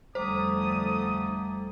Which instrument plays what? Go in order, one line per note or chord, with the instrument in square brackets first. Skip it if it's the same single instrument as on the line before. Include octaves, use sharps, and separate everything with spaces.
[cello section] F2 D3 A3 [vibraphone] G3 A#5 D6 [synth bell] C5 [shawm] D#6